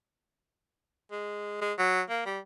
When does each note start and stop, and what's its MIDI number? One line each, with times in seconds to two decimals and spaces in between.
1.12 1.60 56
1.61 1.73 56
1.79 2.01 54
2.09 2.25 58
2.26 2.39 55